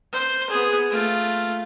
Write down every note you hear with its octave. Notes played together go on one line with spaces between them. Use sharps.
C5
B3 G#4
A3 F4